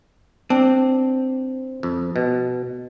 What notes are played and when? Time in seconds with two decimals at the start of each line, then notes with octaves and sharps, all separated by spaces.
0.50 C4 D4
1.83 F2
2.16 B2